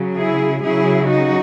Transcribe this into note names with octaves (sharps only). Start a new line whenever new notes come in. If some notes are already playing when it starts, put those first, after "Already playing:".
Already playing: C#3 F#3
E4 G#4
C#3 F#3 E4 G#4
D#4 F#4